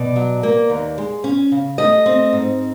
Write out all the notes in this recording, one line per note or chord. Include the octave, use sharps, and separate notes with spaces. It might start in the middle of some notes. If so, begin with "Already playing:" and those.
Already playing: B2 D5
F#3
A#3
D#2
G#3
C#4
C#3
A3 D#5
C4
G#2